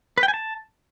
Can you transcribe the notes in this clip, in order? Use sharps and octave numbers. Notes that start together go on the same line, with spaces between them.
B4
G5
G#5
A5